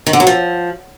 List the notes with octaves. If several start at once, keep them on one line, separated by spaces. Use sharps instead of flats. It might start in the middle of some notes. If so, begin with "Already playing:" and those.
D#3
D3
F#3
F3